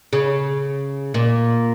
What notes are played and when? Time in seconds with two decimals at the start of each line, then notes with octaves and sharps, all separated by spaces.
0.13 C#3
1.14 A#2